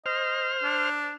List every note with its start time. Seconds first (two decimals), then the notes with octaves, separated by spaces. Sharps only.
0.06 C5 D#5 F6
0.63 D4